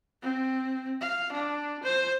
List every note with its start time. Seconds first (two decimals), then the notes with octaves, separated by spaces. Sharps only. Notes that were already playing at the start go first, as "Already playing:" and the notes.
0.22 C4
1.01 F5
1.32 D4
1.83 C5